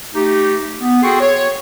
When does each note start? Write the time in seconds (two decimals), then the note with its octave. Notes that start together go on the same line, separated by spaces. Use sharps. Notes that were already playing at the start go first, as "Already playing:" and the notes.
0.14 A3 D#4 G4
0.81 B3
1.03 F#4 G#4 A4 G5 C6 C#6
1.20 C#5